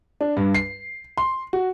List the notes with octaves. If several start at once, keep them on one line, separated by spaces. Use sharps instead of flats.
D4
G2
C7
C6
F#4